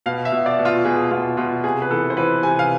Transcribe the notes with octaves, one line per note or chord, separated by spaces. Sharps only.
B2 F5
E5
B2
D5
B2
F4
B2 G#4
B2 F4
B2 F4
C3 G#4
B4
E3 A4
C5
E3 B4
C3 G#5
F5